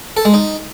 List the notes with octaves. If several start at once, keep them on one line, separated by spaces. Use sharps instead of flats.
A4
G#3
D#4